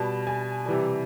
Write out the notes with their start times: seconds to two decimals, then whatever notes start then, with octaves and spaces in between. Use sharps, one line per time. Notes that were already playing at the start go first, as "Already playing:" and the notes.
Already playing: B2 G3 A5
0.27 G#5
0.66 C3 E3 G3